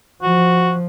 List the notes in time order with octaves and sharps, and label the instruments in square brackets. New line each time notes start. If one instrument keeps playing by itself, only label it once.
[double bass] F3 [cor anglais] F#4